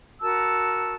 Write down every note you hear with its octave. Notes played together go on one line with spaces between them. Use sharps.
F#4 A#4 A5 E6